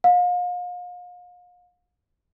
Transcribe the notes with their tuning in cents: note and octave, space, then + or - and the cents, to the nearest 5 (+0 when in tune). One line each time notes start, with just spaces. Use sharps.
F5 +40